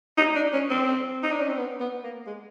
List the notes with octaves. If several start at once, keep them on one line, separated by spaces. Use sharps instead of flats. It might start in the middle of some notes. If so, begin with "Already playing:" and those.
D#4
D4
C#4
C4
D#4
D4
C#4
C4
B3
B3
A#3
G#3